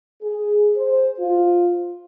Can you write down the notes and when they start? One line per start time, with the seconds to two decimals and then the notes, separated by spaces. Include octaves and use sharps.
0.22 G#4
0.76 C5
1.19 F4